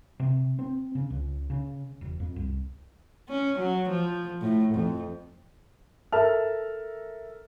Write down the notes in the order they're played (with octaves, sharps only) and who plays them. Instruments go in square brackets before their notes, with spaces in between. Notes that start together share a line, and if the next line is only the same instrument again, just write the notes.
[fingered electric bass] C3
C4
C#3
C#2
C#3
E1
F2
C2
[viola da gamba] C#4
F#3
F3
A2
F2
[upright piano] A4 A#4 E5 A5 F6